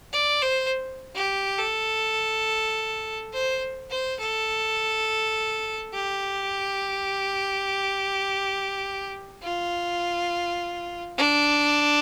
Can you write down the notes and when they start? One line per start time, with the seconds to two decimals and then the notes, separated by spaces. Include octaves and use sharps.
0.13 D5
0.42 C5
1.15 G4
1.58 A4
3.33 C5
3.90 C5
4.20 A4
5.94 G4
9.43 F4
11.17 D4